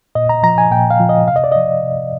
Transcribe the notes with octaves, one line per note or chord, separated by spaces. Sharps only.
A#2 D#5
A#5
F3 A#5
G#5
A#2 G5
F5
F3
D#5
C3 F5
D#5
D5
F3 D#5
C3